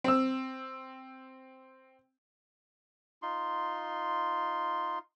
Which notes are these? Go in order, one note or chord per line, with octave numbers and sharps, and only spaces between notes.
C4 E6
D#4 F4 C6